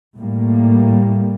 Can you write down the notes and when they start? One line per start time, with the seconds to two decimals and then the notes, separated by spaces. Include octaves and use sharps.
0.15 A2 G3 A#3